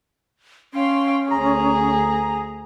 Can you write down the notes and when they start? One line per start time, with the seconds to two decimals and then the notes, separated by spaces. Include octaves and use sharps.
0.73 C#4 F5 G5 C6
1.31 D2 G#4 A#5